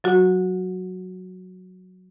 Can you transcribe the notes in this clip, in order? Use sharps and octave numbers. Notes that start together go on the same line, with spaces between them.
F#3 F#4